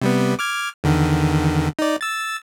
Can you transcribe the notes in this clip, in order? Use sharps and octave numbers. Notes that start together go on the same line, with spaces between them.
C3 G3 B3
D6 F6 G#6
E2 D3 D#3
D#4 D5
E6 A6